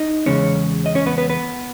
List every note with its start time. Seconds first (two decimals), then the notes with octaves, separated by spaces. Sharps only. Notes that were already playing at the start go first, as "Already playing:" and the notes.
Already playing: D#4 D#5
0.26 E2 C#3 E3 G#3 C#4 C#5
0.86 D#5
0.95 C#4 C#5
1.06 B3 B4
1.18 B3 B4
1.30 B3 B4